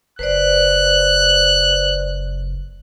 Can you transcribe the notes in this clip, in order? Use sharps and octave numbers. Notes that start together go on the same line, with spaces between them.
F#1 B4 C5 D5 F#6